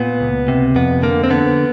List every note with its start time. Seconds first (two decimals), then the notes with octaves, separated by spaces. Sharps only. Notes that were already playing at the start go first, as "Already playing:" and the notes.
Already playing: A#2 B3
0.21 C#2
0.48 C3
0.76 F2 B3
1.03 D3 A#3
1.24 C4
1.30 D3 B3